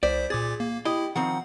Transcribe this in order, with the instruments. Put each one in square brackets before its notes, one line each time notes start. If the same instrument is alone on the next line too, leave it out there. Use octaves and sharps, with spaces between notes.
[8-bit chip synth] C2 C5 B6 [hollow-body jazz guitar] D5
[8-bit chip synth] A#2 D6 A6 [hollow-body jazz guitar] G#4
[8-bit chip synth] A#3
[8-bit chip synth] E4 [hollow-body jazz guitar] G4 D#5
[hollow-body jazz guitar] D#3 F3 C4 [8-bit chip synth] F#5